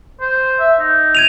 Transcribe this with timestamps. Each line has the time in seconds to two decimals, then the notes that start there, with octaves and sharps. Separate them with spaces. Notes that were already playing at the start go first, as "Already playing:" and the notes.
0.20 C5
0.59 E5
0.79 D#4
1.15 G#6 D#7 F7